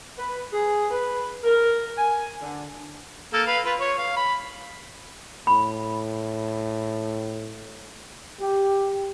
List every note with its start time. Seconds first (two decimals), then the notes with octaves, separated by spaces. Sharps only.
0.18 B4
0.52 G#4
0.91 B4
1.44 A#4
1.98 G#5
2.41 D3
3.33 A#3 A4
3.47 B4 F5
3.65 F4 B4
3.80 C#5
3.98 F5
4.16 B5
5.47 A2 B5
8.39 G4